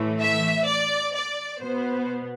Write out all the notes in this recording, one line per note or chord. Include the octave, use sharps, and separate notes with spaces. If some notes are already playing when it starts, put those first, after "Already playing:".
Already playing: A2 E3 A3
E5
D5
D5
B2 B3 C5